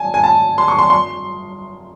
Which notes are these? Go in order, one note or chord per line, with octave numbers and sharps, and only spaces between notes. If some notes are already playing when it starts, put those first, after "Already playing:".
Already playing: G#5 A5
G#5
A5
C6
C#6
C6
C6